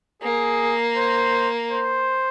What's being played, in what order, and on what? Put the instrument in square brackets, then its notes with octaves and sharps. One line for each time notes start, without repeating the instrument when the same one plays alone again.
[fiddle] A#3 [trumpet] G#4
[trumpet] C5
C5